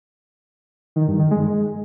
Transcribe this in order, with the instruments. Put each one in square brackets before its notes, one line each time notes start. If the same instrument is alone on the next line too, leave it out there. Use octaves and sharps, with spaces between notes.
[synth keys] D#3
G2
D#3
G#3